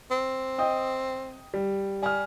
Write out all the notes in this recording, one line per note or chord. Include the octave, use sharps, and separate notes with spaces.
C4
D#5 G5 D#6
G3
G3 G#5 F6